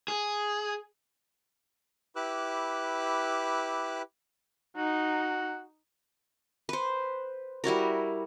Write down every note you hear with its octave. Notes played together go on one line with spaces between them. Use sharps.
G#4
E4 G4 B4 D6 E6 F#6
D#4 F#4
B4 C5
G3 E4 F#4 A#4